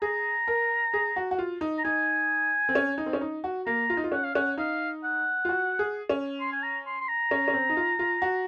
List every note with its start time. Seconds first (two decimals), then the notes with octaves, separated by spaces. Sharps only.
0.02 G#4 A#5
0.48 A#4
0.94 G#4
1.16 F#4
1.31 F#4
1.38 F4
1.61 D#4
1.78 A#5
1.84 D#4 G#5
2.69 C4
2.75 C#4
2.98 D#4
3.06 C4
3.13 C#4
3.21 D#4
3.44 F#4
3.67 A#3 A#5
3.90 F4
3.97 D#4
4.04 F4
4.12 C#4 F#5
4.23 F5
4.34 C#4 F#5
4.58 D#4 F5
5.04 F#5
5.45 F4
5.49 F#4
5.79 G#4
6.09 C#4
6.40 C6
6.52 G#5
6.63 A#5
6.86 C6
7.00 C6
7.08 A#5
7.31 C#4
7.48 C#4
7.53 C4
7.69 D#4
7.77 F4
7.99 F4
8.22 F#4